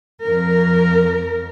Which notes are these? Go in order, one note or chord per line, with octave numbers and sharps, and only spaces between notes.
F2 A#4